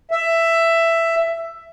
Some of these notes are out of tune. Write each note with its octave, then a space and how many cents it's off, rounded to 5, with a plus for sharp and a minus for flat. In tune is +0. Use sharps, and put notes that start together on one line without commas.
E5 +10